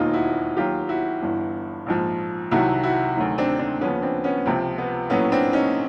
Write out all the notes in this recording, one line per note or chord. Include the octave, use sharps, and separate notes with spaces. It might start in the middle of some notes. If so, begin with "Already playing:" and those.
Already playing: E1 D#2 D#3 D#4 F4
E4 F#4
D#2 D#3 F#3 F4 G4
E4 F#4
G1 G2 E3
A#1 G#2 F3
C2 C3 D#3 F#3 E4 F#4
E4 F#4
D2 C3 D#3 F#3
C4 D4
C4 D4
D#2 C#3 F3 B3 C#4
C4 D4
B3 C#4
C#2 C3 F3 C4
B3
A#1 A2 F#3 B3 C#4
C4 D4
C#4 D#4